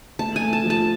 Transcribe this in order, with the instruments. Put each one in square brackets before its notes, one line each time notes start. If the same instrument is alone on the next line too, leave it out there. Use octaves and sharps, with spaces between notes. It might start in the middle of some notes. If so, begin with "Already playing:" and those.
[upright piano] A3 [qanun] A5
[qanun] G#5
[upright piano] A3
[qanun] A5
[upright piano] F3
[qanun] A5